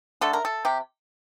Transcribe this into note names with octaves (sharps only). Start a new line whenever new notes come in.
D3 A3 A4
A#4
A4
C3 G4